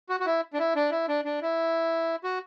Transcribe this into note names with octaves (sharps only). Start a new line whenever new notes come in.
F#4
F#4
E4
D4
E4
D4
E4
D4
D4
E4
F#4